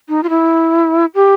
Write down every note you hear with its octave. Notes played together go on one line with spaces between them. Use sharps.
D#4
F4
E4
G4